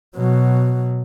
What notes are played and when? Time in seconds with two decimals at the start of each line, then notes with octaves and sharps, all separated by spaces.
0.16 B2 F#3